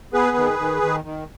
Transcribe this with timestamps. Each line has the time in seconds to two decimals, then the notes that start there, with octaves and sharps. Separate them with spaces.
0.13 B3 G#4 B4
0.37 D#3
0.59 D#3
0.82 D#3
1.04 D#3